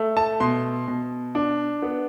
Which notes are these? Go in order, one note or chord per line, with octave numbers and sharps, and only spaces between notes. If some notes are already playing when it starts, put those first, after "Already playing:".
Already playing: A3
A5
B2 C6
B2
D4
B3